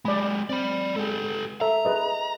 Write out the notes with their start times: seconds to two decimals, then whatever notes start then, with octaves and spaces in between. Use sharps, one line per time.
0.05 G#3 G4 D5 B5
0.49 C4 D5 B5
0.96 G#3 G4 A4
1.61 A4 E5 A#5
1.85 G#4 B4 D#5